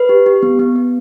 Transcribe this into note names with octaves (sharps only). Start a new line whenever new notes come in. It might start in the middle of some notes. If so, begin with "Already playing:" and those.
Already playing: B4
G4
G4
B3
B3
B3